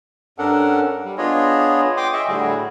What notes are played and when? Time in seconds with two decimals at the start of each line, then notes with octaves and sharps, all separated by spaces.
0.38 G2 C#4 D4 A4 A#4 F#5
1.04 G3
1.18 B3 D4 F4 G#4 C#5 D#5
1.97 G5 C6 D6 D#6
2.13 G#4 D#5 E5 C#6
2.28 A2 D3 G3 F#4 G#4